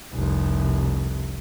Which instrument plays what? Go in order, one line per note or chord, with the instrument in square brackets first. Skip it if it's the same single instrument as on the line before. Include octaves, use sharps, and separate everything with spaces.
[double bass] F1 C2